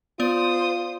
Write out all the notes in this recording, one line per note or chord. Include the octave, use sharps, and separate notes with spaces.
B3 F4 C5 D5 D#6 D7